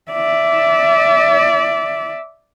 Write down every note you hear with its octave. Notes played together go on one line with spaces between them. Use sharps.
D5 E5